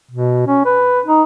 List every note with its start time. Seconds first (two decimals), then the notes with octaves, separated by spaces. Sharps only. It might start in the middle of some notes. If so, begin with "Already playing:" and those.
0.11 B2
0.47 C#4
0.65 B4
1.06 D#4